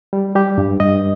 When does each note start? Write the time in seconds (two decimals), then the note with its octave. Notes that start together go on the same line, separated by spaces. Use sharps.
0.13 G3
0.35 G3 G4
0.58 G2
0.80 G2 D#5